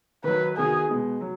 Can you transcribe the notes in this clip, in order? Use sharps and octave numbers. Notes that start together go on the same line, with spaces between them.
D#3 F#3 D#4 B4
D#3 B3 F#4 G#4
B2 G#3 B3
F#3